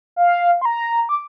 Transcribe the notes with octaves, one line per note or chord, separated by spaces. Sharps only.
F5
C6
A#5
D6